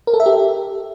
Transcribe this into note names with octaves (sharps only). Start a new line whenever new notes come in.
A#4
A4
E5
G4